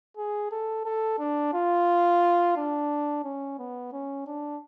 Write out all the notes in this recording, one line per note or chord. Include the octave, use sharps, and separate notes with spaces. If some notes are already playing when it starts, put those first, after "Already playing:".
G#4
A4
A4
D4
F4
D4
C#4
B3
C#4
D4